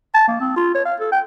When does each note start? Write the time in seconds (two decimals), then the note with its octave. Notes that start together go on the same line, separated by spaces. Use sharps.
0.14 A5
0.28 A#3
0.40 C4
0.56 F4
0.74 C#5
0.86 F5
1.00 A4
1.12 G5